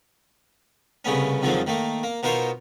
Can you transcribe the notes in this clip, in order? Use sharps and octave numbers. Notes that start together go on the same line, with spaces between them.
C2 C#3 A3 B3 C#4
F2 G#2 D3 D#3 F3 F#3
D#3 A3 A#3
A#3
B2 D#4 F4 A#4 C5 C#5